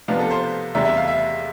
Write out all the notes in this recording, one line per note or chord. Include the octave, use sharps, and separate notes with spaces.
C3 F3 B3 D4 F4
A4
C5
E2 C3 G3 D4 E5
E5
F5
E5